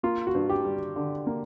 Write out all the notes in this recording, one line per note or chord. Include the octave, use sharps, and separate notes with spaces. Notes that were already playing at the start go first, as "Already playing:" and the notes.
A#3 F4
F#4
G2
G4
G3
D3
A#3